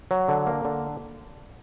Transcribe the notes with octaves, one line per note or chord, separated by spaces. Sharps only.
F#3
D3
A#3
D3